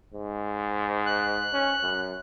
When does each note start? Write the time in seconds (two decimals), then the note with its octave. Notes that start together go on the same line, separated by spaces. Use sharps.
0.14 G#2
1.06 F#6
1.53 C#4
1.83 F#2